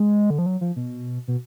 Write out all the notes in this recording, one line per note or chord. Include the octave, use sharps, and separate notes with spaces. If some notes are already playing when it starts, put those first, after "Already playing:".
Already playing: G#3
D3
F3
F#3
F3
B2
B2